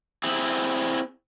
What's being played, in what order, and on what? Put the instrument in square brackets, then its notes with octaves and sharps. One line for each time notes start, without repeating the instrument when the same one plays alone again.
[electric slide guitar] C4 E4 G#4